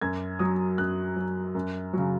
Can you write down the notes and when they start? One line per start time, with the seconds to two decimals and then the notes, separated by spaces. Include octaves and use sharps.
0.01 F#2 G#6
0.39 F#3 D#6
0.78 F#2 F#6
1.16 F#3
1.55 F#2
1.93 C#3 F#3